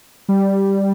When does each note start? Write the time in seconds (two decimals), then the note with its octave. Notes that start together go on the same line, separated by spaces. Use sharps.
0.29 G3